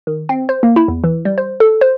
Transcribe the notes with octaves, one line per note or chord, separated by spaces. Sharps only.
D#3
C4
C5
A#3
E4
E2
E3
G3
C5
A4
C5